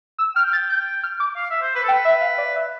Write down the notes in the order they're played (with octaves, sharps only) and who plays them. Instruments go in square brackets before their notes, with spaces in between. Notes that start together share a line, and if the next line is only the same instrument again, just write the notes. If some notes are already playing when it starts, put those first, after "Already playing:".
[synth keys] E6
[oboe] G5 [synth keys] F6
[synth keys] A6
G6
F6
D6
[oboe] F5
E5
C5
B4
A4
[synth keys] G5
[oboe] B4
[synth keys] E5
F5
D5
E5